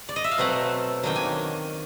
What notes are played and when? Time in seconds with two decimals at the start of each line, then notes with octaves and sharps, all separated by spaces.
0.09 D5
0.16 D#5
0.24 E5
0.31 F5
0.38 B2 F#3 A3 C4 F#5
1.03 D#3 F#3 A#3 D4 G5
1.16 G#5